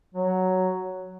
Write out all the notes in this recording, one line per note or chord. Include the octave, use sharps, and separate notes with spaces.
F#3